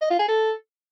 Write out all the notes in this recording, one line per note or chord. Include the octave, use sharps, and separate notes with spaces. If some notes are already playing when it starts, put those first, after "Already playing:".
D#5
F4
G#4
A4